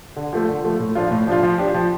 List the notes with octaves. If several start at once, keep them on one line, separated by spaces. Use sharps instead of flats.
D3
F3 A3
D3
F3 A3
A2
F3 D4 F4
A2
F3 D4 F4
F3
D4 G4
F3